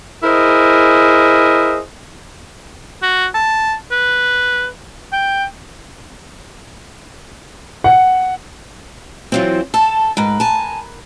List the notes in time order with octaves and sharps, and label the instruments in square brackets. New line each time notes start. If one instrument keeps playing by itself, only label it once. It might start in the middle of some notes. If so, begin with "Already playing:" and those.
[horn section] E4 G#4 A#4 C5 D#5
[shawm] F#4
A5
B4
G5
[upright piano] F#5
[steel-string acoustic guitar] E3 F#3 C4 [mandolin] F4 C5
[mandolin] A4 [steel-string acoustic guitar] A5
[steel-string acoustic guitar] G#2 [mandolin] A#4 B4
[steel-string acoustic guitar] G#5 A5